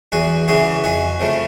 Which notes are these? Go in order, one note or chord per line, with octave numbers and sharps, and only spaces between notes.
E2 F#4 G#4
C#3 E3 F#4 G#4
F2 F#4 G#4
C#3 F3 A3